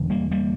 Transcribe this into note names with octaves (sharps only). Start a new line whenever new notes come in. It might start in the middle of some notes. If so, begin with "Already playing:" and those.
Already playing: E1 D3
G3 A#3
G3 A#3